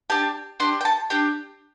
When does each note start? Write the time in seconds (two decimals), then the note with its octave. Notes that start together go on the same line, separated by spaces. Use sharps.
0.10 D4 G4 A5
0.60 D4 G4 C6
0.81 G5
0.85 A5
1.10 D4 G4 G5